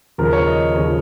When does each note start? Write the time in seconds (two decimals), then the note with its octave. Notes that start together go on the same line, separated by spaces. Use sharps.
0.18 D#2 C#3 F3 A#4
0.33 C#5
0.47 D#5
0.75 D#2 C#3 F3 C#5